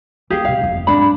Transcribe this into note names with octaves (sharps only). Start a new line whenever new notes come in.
E3 B3 G4 G#4 F5
G2 B2 F5
F#1 F2
G#1 F#2 D4 B5